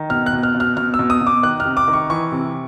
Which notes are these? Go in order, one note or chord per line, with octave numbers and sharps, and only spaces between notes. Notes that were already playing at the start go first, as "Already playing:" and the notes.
Already playing: D#3
B2 F6
F#6
B2
F6
B2
F6
B2 F6
E6
B2
D#6
B2
D6
D#3 F#6
F6
C3
D6
D#3
C#6
E3 C#6
C3